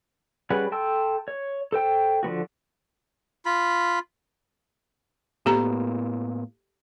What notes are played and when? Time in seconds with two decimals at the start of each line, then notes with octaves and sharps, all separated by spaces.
0.50 G3 C#4 G#4 B4 F#5
0.72 A4 G5 A5 C6 E6
1.28 C#5
1.72 A4 C5 G5
2.23 D3 F3 B3 F#4
3.46 F4 B5
5.46 A2 A#3 B3 G4 A4 A#5